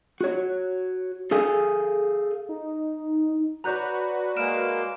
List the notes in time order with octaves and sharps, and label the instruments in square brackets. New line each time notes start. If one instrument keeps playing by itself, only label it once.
[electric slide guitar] F#4 C#5
G#4 A4 F5 G#5
[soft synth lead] D#4
[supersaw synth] F#4 B4 [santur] C#5 D5 B5 [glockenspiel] A#5 F#6 G6
[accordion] G#3 A#3 [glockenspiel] F6 D7 E7